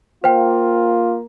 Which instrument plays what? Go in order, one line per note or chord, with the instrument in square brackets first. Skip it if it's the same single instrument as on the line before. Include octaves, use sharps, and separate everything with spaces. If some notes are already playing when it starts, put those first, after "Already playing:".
[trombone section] A#3 [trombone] F4 [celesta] C5 G5